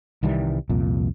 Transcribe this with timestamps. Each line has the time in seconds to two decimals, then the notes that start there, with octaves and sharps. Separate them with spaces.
0.23 C2 D#3 E3 G3
0.69 C2 F2 A#2